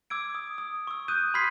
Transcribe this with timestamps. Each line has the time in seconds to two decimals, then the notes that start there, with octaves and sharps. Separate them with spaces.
0.10 D6 E6 G#6 D7
0.35 D#6
0.58 D#6
0.87 C#6 E6
1.08 D#6 F#6 G6 D#7
1.34 B5 C6 F6 G#6 B6 C7